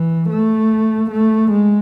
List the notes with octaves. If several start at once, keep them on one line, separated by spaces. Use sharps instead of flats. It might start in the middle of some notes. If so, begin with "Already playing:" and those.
Already playing: E3
A3
A3
G#3